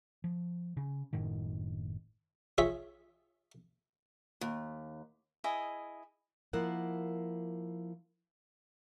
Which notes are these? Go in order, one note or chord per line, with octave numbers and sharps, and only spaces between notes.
F3
C#3
F#1 F#2 A2 D#3
F4 G#4 C#5 E5
D#2
E4 G#4 D#5
F3 A#3 E4 A#4 F#5